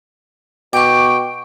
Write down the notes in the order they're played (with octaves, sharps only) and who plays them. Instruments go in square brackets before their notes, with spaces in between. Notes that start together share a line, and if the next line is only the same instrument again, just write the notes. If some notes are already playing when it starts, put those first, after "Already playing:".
[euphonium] B2 [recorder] G5 [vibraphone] C#6 D6